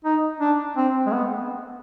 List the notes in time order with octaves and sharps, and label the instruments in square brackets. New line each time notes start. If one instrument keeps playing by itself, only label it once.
[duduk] D#4
D4
C4
G#3
B3